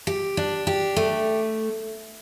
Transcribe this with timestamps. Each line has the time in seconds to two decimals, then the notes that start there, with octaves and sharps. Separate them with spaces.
0.07 G4
0.37 D4
0.67 G4
0.96 A3